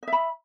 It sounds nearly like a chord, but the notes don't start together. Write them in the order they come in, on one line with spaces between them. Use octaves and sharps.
D#5 E5 B5